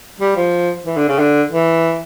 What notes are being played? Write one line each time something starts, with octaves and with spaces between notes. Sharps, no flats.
G3
F3
E3
D3
C#3
D3
E3